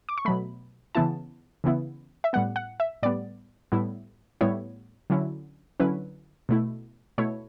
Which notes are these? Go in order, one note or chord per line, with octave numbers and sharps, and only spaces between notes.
D6
C#6
B2 F#3 A3 B5
C#3 E3 B3 E4 A5
C#3 E3 B3 E4
E5
A2 G3 B3 F#5
F#5
E5
A2 G3 B3 D5
A2 G3 B3 E4
A2 G3 B3 E4 C#5
D3 F#3 C#4 E4
D3 F#3 C#4 E4 B4
B2 A3 E4
B2 A3 E4 C#5